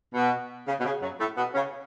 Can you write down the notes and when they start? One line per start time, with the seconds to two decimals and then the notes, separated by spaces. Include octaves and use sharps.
0.14 B2
0.67 C#3
0.79 B2
0.85 C#3
1.02 F#2 F#3
1.19 A2 A3
1.36 B2 B3
1.54 C#3 C#4